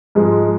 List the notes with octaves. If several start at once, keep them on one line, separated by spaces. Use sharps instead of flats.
G#2 F3 G#3